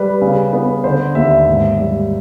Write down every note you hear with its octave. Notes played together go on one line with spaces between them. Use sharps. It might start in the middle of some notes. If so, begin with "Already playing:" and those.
Already playing: G3 B4
C#3
B3
D3 C5
D#2 E5
G#2
G3